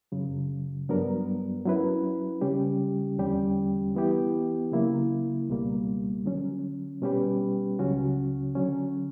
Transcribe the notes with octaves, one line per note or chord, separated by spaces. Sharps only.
F#2 C#3 F#3
G2 F#3 B3 D4 A#4
F#3 C#4 E4 B4
C#3 G3 C#4 G4
E2 D3 G3 C#4 G4
E3 B3 E4 G4
C#3 F#3 A#3 E4
C#2 B2 G3 A#3
D3 F#3 C#4
B2 G3 C#4 G4 B4
C#2 C#3 F#3 C#4 F#4
D3 F#3 C#4